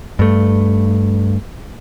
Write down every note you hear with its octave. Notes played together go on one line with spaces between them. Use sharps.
G2 A3